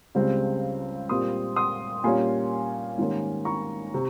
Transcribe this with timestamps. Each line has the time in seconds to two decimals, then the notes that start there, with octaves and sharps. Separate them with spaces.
0.15 C#2 C#3 G3 C4
1.09 A#2 G3 C4 C6 D#6
1.56 C6 D#6
2.04 A#2 G3 A#3 C#4 G#5 C6
2.98 G#2 D#3 G3 A#3 C#4
3.45 A#5 C#6
3.94 C3